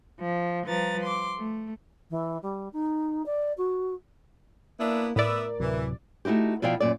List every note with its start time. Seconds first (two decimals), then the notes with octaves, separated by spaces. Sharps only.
0.20 F3
0.66 F3 G3 B4 A#5 A6
1.02 C6 D6
1.39 A3
2.10 E3
2.42 G3
2.73 D#4
3.26 D5
3.57 F#4
4.79 A#3 B3 D4 E4
5.16 A2 B3 A#4 B4 D5 E5
5.60 D1 C3 E3 F#3
6.25 A3 D#4 E4 F#4 G4
6.62 B2 F3 E4 D5 F5 G5
6.80 F#2 A#2 D5